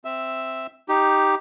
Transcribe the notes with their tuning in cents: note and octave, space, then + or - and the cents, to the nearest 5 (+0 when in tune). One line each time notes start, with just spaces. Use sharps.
C4 +0 E5 +0
D#4 +0 G4 +0